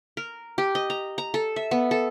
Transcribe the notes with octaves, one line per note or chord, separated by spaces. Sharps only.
A#4
G4
D#5
A#5
A#5
A4
E5
B3
A4